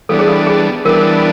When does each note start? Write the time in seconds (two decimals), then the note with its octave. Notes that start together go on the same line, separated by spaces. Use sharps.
0.09 E3 G3 B3 D4 A4
0.19 G#4
0.28 A4
0.47 G#4
0.85 E3 G3 B3 D4 A#4